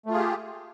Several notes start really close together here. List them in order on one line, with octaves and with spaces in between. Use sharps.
A3 F4 G#4 G4